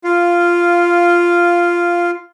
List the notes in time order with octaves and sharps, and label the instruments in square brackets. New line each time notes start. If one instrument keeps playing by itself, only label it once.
[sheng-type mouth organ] F4 F5